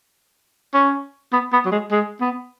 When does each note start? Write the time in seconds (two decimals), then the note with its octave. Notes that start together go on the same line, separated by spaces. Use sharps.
0.74 C#4
1.33 B3
1.53 B3
1.65 F#3
1.72 G#3
1.92 G#3
2.21 B3